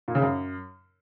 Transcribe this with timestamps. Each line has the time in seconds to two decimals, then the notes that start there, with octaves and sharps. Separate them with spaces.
0.08 A#2
0.15 C#3
0.22 F#2